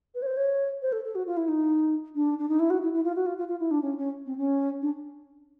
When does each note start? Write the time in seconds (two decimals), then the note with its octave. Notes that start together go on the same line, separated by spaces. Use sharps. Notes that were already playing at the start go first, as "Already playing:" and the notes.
0.15 B4
0.22 C#5
0.26 C5
0.37 C#5
0.82 C5
0.92 A4
1.05 A4
1.15 F#4
1.26 F4
1.37 E4
1.48 D#4
2.15 D4
2.38 D4
2.49 D#4
2.59 E4
2.70 F#4
2.82 E4
2.93 E4
3.04 F4
3.15 F#4
3.26 F4
3.38 F4
3.48 F4
3.60 E4
3.71 D4
3.82 C#4
3.98 C#4
4.26 C4
4.38 C#4
4.82 D4